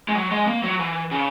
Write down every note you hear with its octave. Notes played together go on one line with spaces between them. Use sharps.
G#3
F#3
G#3
A#3
F#3
E3
C#3